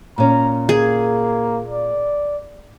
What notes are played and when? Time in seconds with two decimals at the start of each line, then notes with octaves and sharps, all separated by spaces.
0.18 A#2 C#4 A#5
0.69 A#3 G#4
1.68 D5